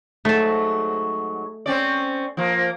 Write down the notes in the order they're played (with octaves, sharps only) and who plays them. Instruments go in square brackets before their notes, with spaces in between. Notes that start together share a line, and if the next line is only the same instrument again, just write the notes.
[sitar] G#2 F#3 [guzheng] A3 A5
[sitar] C4 C#4 D5
F3 A#3